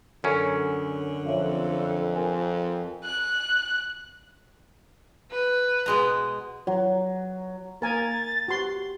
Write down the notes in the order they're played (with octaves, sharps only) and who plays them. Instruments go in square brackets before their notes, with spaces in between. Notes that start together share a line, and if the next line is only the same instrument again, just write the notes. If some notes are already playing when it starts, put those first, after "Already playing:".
[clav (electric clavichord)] F#2 C#4 [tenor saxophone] D3 [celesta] A4
[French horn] F2 [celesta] C#5 E5 F5
[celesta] A#4 G#5
[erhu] F#6
[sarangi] B4
[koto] B2 G#3 A#5
[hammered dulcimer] F#3
[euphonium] A#3 [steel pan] A#4 G#5 [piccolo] A6
[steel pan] F#4 C6 [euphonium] G4